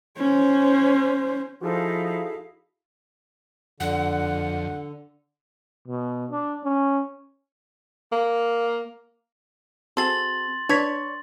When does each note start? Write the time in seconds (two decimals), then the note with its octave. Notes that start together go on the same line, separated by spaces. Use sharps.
0.17 C#4 C5
1.61 F3 D#4 E4 F#4 G#4 A4 F5
3.80 F2 D3 F#5
5.88 B2
6.31 D4
6.64 C#4
8.12 A#3
9.97 C4 F#4 G#4 A4 C6 A6 F#7
10.69 D4 B4 C#5 D5 G#6 B6